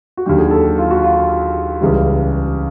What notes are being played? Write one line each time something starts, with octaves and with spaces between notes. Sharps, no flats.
F#4
D#2 D3 F#3 G4
G#4
A4
F4
F#4
F4
C#2 C#3 E3 G3